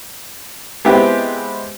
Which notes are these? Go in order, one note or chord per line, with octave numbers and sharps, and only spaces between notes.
G#3 B3 C4 E4 G4